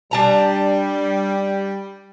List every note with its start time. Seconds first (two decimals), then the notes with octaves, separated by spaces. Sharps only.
0.11 G3 D4 A5 A#5